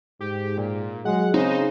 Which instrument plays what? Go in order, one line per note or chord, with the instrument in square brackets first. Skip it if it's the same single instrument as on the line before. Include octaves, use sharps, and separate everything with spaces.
[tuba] G#2 [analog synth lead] G4
[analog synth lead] A#2
[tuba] F#3 [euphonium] G#3 [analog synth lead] F#5
[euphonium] C#3 [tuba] C4 [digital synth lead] D#4 [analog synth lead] C5